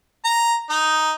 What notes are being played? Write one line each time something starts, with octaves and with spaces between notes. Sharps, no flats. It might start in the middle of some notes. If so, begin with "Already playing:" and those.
A#5
D#4